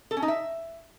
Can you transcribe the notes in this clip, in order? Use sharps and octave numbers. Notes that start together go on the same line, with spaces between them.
A4
C#4
D#4
E5